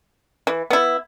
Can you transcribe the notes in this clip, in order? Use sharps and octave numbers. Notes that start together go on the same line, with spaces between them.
E3
B3 E4